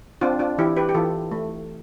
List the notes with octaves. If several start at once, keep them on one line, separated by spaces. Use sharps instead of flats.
C4 D4 F4
D4 F4
E3 E4 G4
G4 B4
G4
E3 F4 A4
A3